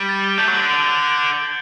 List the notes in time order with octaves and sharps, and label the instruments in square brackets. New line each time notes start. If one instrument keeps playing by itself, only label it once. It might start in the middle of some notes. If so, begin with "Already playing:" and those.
Already playing: [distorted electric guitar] G3
[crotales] A6
G7
[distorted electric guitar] A3 [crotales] G6
[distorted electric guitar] F#3
[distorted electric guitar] D3 [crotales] F#7
[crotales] D7